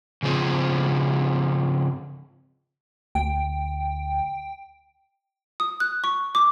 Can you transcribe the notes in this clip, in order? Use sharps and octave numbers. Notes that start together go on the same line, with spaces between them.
C#3 F3 C4 G#4
D2 G5
D#6
F#6
C#6
D6